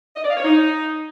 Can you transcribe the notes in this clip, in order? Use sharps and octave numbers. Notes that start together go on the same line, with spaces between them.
D#5
D5
F5
C#5
D#4